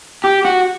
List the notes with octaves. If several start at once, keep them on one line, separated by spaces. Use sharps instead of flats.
G4
F#4